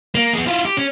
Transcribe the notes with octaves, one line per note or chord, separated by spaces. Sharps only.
A#3
B3 G#4
E4 F4
G4
C#4